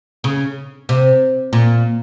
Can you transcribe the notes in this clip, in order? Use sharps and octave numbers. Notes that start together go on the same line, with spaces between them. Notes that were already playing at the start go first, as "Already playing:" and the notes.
C#3
C3
A#2